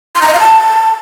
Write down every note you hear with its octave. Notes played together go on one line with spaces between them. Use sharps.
C6
A#5
D#5
F5
A5